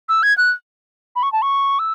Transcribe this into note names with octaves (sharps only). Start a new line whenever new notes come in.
E6
G#6
F#6
B5
C#6
A5
C#6
E6